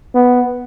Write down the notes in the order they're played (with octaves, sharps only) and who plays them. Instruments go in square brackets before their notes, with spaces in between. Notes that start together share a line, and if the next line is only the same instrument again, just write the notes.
[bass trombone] B3